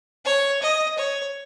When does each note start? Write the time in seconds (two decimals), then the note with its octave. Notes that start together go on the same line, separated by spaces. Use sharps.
0.25 C#5
0.62 D#5
0.98 C#5